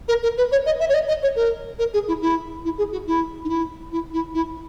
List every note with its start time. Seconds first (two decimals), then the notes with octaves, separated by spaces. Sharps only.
0.08 A#4
0.23 A#4
0.37 B4
0.51 C#5
0.66 D#5
0.80 E5
0.89 C#5
0.94 D#5
1.08 D#5
1.22 C#5
1.36 A#4
1.79 A#4
1.93 G#4
2.08 E4
2.21 E4
2.64 E4
2.78 G#4
2.92 F#4
3.07 E4
3.44 D#4
3.49 E4
3.92 E4
4.13 E4
4.34 E4